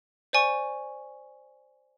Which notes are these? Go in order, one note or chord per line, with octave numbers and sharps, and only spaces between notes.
C5 D5 G#5 C#6